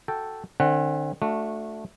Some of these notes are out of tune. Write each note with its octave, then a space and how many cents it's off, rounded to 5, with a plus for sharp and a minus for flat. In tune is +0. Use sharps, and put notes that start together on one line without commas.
F#4 +5 A4 +0 G5 +0
D3 +45 C4 +40 F#5 +0
A3 +0 D4 +0 F#4 -25